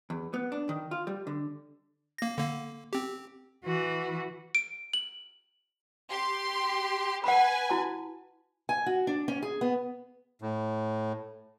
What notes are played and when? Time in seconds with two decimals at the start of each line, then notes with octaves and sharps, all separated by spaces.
0.10 E2
0.34 B3
0.52 D4
0.69 D#3
0.91 F4
1.07 G3
1.27 D3
2.18 A#3 A#6
2.38 D3 A#3
2.93 C4 G4
3.64 E3 F#4
4.55 D7
4.93 F#7
6.09 G4 C6
7.24 B4 F#5 G#5 B5
7.70 E4 F#4 A5
8.69 G#5
8.86 F#4
9.07 D4
9.28 C#4
9.42 G#4
9.61 B3
10.41 A2